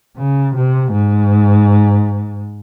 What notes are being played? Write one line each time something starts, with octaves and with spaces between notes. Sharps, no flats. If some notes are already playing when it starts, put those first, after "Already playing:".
C#3
C3
G#2